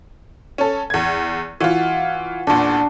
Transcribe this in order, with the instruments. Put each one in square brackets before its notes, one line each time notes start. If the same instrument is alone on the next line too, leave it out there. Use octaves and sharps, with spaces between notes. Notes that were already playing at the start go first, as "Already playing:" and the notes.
[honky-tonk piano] C#4 A4
E2 G#6
[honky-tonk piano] E3 F4 [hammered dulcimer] F#4
[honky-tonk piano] E2 A#2 [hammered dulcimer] D4 C6